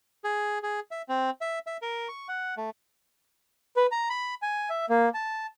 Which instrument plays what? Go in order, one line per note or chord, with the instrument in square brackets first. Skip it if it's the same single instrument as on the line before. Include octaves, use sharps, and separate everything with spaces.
[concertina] G#4
G#4
E5
C4
E5
E5
A#4
C#6
F#5
A3
[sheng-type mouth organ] B4
A#5
B5
G#5
E5
A#3
A5